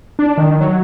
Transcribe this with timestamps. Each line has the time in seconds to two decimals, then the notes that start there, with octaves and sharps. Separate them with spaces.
0.19 D4
0.38 D#3
0.61 F#3